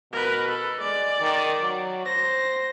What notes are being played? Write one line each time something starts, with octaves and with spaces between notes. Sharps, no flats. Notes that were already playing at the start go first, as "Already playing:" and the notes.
B2 A#4 B4
A4
G#3 D5
D#3
F#3
C5 A#6